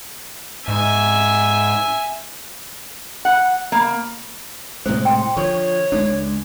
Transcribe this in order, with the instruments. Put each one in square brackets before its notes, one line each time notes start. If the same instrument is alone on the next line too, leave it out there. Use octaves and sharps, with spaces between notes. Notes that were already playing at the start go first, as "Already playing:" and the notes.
[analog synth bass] G#2 [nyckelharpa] E5 G#5
[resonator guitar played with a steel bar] F#5
A#3
[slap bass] A2 C3 G#3 [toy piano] C5
[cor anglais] C5 [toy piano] G5
[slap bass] D3 F3 [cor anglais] C#5
[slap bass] C#2 G#3 D4